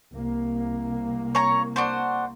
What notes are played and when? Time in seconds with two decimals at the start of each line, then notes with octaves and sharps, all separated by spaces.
0.12 C2 A#3
1.35 C#5 A#5 C#6
1.76 D4 F#4 C5